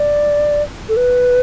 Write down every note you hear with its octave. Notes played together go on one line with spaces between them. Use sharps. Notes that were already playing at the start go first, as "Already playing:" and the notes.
Already playing: D5
A4
B4